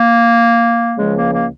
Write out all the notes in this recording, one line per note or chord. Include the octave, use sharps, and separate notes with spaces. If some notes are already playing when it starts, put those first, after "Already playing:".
Already playing: A#3
C#2 C#3 F3 G#3
A#3
A#3